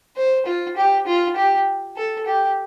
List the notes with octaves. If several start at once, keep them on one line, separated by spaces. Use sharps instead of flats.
C5
F4
G4
F4
G4
A4
G4